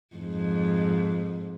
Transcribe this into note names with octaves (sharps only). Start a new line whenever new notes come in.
F2 G#2